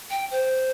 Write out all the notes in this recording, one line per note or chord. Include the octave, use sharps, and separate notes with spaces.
G5
C5